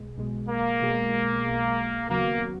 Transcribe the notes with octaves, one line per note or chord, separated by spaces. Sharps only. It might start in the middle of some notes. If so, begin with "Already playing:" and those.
Already playing: B1 B2 G#3
B1 B2 G#3
A#3
B1 B2 G#3
B1 B2 G#3
D#2 C#3 F#3 A#3 B3 F#4